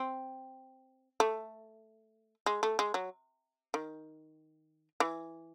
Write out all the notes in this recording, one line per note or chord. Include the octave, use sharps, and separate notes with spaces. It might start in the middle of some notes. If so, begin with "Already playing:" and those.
Already playing: C4
A3
G#3
A3
G#3
F#3
D#3
E3